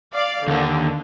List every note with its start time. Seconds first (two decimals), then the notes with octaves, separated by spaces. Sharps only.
0.14 D5 F5
0.47 D#2 D3 D#3